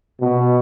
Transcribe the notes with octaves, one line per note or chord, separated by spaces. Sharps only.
B2